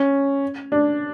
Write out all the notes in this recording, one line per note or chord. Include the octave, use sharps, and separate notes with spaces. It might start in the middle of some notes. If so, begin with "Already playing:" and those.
Already playing: C#4
D4